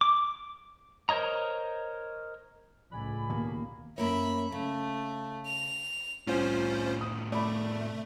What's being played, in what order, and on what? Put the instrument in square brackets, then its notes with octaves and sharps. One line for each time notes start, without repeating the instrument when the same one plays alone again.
[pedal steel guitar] D6
A#4 C5 C#5 D#5 A#5
[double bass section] C#2 A2 [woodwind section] D5 G#5 B5
[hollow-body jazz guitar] D#2 B2 [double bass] A#3
[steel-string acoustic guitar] F#2 A#3 C#5 [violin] E5 B5
[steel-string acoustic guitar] C#3 [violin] A3
[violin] F7
[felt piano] C2 [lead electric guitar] A2 C3 [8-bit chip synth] C#4 F4 C5
[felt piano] D#6
[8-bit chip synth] A3 [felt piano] D5 B5